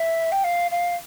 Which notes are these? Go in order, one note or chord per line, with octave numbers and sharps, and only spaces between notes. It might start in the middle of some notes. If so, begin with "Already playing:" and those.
Already playing: E5
G5
F5
F5